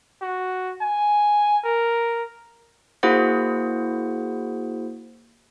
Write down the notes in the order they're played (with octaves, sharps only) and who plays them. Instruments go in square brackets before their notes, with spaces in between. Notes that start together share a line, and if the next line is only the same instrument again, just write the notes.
[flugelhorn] F#4
G#5
A#4
[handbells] A#3 E4 F#4 G#4 C5 F#5